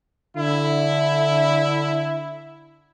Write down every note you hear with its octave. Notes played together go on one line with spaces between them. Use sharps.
D3 E4